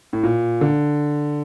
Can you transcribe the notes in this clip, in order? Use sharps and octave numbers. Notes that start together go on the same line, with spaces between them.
A2
A#2
D3